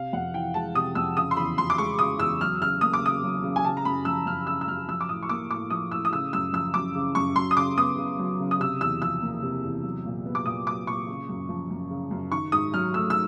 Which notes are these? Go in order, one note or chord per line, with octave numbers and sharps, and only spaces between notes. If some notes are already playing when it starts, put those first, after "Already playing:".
Already playing: C3 F5
F2 F#5
E3 G5
G#3 A5
C3 D#6
F2 E6
C#3 D#6
C6
E2 B5
F3 C6
D6
G#3 C#6
C#3 D#6
E2 E6
F#3 F6
C#3 F6
A#3 D#6
D6
C#3 D#6
F#3
C#3
G#5
C#3 A5
A#5
F#2 B5
F3 E6
F#2 F6
C#3 E6
E6
F#2 F6
F3 E6
D6
A2 D#6
C#6
A#3 D6
A2 D6
F3 D#6
A2 E6
D#6
C#3 E6
F#2 E6
F3 E6
F#2 D6
C#3
F#2 C#6
F#3 C6
D#6
C#3 D6
B3 D#6
C#3
F#3
C#3
D#6
C3 E6
E2 E6
F3 E6
A#3
C3
E2
F#3
A#2
B3
D6
A#2 D#6
F#3 D6
A#2 C#6
C#3
F#2
F3
F#2
C#3
F#2
D#3 C#6
G#2 D#6
F#3 F6
A3 E6
E6